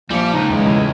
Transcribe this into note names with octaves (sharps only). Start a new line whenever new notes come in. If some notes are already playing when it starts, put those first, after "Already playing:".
A#1 F3 G3 A#3 C#7
C#2 D#4
F#1 E2 G#3
E2 A2 C#3 G#5